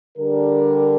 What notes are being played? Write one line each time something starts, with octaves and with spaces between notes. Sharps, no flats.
D3 G3 D4 G4 A#4